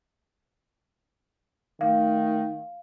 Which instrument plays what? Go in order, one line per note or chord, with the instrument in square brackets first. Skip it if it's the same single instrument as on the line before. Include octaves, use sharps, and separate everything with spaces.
[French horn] D#3 [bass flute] A3 [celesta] F5